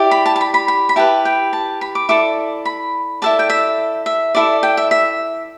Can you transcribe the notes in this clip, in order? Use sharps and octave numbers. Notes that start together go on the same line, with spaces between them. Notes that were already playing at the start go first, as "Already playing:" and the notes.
Already playing: E4 G4 D5
B5
A5
A5
B5
B5
B5
B5
E4 G4 B4 A5
G5
A5
B5
D6
E4 A4 D5 D6
B5
E4 A4 D5 A5
G5
E5
E5
E4 A4 D5
G5
E5
E5